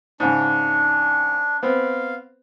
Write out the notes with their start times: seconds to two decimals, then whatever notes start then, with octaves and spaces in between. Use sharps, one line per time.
0.20 G#2 C#3 D4
1.63 B3 C4 F5